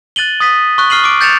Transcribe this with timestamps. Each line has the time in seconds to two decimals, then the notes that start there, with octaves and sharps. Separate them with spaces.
0.16 F#6 A6 D#7 F#7 G7
0.40 D#6 A6 B6 D#7
0.78 C#6 F#6
0.90 C#6 F6 C7 D#7 F#7
1.04 D6 D7
1.21 G6 A6 C#7 E7 F7